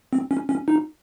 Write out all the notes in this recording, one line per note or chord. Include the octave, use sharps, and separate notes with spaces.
C4
C#4
C#4
D#4